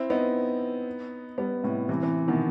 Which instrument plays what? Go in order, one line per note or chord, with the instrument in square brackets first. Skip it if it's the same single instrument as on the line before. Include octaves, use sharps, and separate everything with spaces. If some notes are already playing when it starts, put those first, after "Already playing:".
Already playing: [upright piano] C4 E4
B3 D#4
G3 B3
A2 C3
C3 E3
C3 E3
B2 D#3